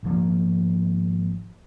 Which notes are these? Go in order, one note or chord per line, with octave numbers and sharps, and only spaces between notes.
G#1 G#2 F3 A#3